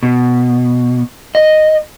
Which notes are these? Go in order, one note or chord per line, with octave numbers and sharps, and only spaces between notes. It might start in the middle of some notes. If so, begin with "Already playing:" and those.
B2
D#5